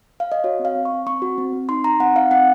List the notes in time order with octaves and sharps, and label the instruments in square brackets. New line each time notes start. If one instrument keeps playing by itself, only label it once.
[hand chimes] F5
D#5
F#4 C#5
C4
F5
C4
C#6
C4
C4 C#6
F#4
C4
C4
D#4 C6
D#4 A#5
C4 F#5
D#4 F5
C4 F#5